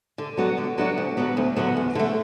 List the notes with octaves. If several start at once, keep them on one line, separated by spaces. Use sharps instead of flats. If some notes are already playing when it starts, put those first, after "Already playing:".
D3
F#3 B3 D4 F#4
D3
F#3 B3 D4 F#4
D2
D3 F#3 B3
D2
D3 F#3 B3
E2
D3 A3